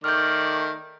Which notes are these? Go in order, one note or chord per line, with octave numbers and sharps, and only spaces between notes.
D#3 A3 D5 F6 G6